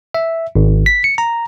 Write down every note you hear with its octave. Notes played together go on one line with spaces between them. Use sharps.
E5
G#1
B6
C#7
A#5